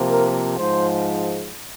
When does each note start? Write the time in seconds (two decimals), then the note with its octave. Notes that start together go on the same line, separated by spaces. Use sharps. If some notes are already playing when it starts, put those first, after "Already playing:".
Already playing: C3 F3 A#3
0.10 A#4
0.58 G#2 F3 G#3 C5